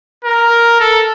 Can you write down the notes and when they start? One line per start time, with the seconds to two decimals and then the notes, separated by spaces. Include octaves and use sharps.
0.25 A#4
0.80 A4